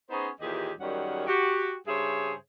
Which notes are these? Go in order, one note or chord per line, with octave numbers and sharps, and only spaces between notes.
B3 C#4 D#4 G#4 C5
D#2 A#2 E3 G4 G#4 D#5
F#2 D#3 G3 C#4 G#4 F#5
F#4 G4
G2 C#3 G#4 C5 C#5 E5